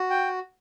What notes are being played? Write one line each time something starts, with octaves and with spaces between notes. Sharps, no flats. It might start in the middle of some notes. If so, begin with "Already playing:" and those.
Already playing: F#4
G5